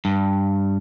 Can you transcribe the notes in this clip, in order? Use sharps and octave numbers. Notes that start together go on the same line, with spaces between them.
G2